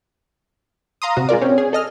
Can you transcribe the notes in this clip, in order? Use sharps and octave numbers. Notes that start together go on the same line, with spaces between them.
F5 A#5 C6 D#6
C3 F#4
G#3 F4 A#4 D5
C4 C#4
G#4
A4 D#5 F6